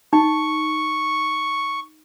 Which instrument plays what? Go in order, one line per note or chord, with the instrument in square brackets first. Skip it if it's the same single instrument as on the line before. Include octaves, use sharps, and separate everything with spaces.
[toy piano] D#4 [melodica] C#6